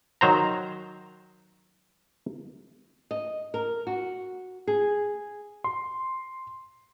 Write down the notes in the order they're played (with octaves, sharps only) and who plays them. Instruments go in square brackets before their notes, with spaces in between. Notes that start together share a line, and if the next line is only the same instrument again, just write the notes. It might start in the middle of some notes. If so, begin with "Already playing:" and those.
[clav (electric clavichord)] D#3 F#3 C5 A#5
[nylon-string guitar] D#5
A#4
F#4
G#4
[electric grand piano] C6